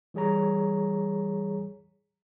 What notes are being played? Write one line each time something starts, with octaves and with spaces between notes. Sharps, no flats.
E3 G3 G#4 C#5 A#5